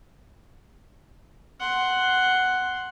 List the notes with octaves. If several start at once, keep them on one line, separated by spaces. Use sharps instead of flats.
F#5 C6